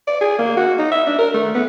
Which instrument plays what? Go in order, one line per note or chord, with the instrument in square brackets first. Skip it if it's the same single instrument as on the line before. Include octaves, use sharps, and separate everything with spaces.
[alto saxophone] D5
G#4
A#3
F#4
D#4
E5
D4
A#4
A3
B3